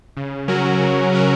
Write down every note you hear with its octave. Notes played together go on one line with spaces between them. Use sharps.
C#3
F#3 C#4 F#4 A#4
C#3
F#3 C#4 F#4 A#4